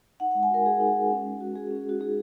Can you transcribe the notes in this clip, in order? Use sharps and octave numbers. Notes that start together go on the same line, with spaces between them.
D#4 F#5
F#5
G#3
G#5
F#4 A#4
G#3 G#4
D#4
G#3
C#4
G#3
F#4
G#3 G#4
C#4
G#3 F#4
D#4 G#4